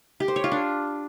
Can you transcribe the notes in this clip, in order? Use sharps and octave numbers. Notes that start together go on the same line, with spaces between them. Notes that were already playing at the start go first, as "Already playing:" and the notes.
G4
C5
C#5
F4
D4